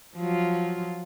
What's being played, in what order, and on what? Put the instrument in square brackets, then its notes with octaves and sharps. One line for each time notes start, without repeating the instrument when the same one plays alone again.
[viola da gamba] F3 F#3 F4